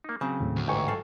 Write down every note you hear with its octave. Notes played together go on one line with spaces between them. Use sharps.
A#3 D#4
C#3 F#3 C4
D#2 A2
D2
A1 G#2 G5 G#5 C#6
F#3 A4 F5